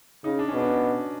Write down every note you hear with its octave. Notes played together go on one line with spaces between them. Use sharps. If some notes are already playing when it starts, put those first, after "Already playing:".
C#3 D#4
D4
B2 C#4
D4